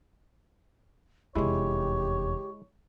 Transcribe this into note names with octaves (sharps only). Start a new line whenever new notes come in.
F1 E2 G#3 E4 G4 C#5